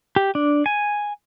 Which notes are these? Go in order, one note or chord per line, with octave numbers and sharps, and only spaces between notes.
G4
D4
G#5